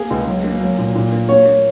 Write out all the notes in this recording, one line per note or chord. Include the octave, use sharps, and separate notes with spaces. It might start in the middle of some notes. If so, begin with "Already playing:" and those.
Already playing: A#3 G#4
C#2
F#3
A#3
F#3
A#2
A#2
A#3
A#3 C#5
A#3